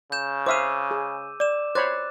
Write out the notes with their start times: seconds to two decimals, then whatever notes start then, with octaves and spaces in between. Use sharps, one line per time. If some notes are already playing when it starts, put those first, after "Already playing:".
0.12 C#3 G6 E7
0.46 C5 E5 F5 D6 E6 D#7
0.91 G#4
1.40 D5 D6 E7
1.75 C5 C#5 B5 D6 F#6 A6